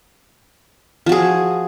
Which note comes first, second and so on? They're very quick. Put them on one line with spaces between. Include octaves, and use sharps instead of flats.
F3 F#4 G#4